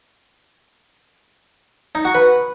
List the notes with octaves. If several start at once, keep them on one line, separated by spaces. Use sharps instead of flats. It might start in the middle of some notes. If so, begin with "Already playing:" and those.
D#4
F#4
B4